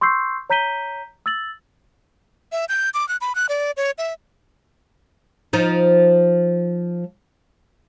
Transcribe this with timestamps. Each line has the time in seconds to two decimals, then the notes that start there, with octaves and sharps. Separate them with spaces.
0.01 C6 C#6 E6 G6 C7
0.50 C#5 A#5 G6 B6 D#7 G7
1.26 E6 A6 F#7
2.52 E5
2.69 G6
2.94 D6
3.09 F#6
3.21 B5
3.35 F#6
3.49 D5
3.77 C#5
3.98 E5
5.53 F3 D#4